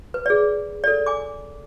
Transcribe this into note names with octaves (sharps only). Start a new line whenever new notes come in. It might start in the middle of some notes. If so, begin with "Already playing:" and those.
B4
G#4 D5
A4 D5
G#5 D6